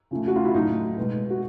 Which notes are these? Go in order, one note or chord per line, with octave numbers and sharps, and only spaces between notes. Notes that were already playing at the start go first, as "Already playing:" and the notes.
C#3 F3 A3
F#4
F4
E4
A2 F#3 A3 D#4
B2 G#3
F#4